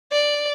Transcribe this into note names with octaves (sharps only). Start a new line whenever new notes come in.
D5